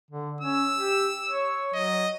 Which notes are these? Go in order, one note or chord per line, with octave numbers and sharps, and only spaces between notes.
D3
C#4 E6
G4
C#5
F#3 D#5